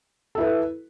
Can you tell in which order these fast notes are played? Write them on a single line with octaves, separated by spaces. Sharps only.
A4 E4 B4